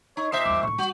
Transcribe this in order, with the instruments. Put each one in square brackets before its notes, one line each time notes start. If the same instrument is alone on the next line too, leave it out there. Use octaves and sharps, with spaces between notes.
[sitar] D#4 [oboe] C#5
[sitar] A#2 C5 E5 [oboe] D#5
[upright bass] E2 G2 [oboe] D6
[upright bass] A2 D#3 [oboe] C#6
[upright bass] G3 [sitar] F#4